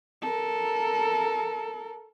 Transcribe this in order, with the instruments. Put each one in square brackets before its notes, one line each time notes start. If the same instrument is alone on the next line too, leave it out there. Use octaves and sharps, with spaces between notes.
[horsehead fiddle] A4 A#4